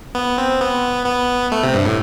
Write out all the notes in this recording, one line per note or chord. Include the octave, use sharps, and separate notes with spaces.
B3
C4
B3
B3
A3
C3
G2
A2